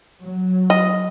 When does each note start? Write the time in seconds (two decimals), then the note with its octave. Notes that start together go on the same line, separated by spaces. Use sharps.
0.21 F#3
0.70 D#5